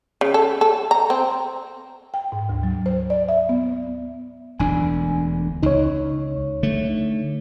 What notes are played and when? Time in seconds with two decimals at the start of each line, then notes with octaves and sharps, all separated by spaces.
0.21 C#3
0.34 A4
0.61 A4
0.91 A#5
1.10 C4
2.14 G5
2.32 G#2
2.49 D2
2.63 F#3
2.86 C5
3.10 D5
3.29 E5
3.49 B3
4.60 E1 D2 D4 G#5
5.63 C#2 D#4 C#5
6.63 D3 A3